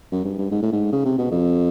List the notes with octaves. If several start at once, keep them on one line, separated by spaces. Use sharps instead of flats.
F#2
G2
G2
G#2
A2
G#2
C#3
C3
B2
F2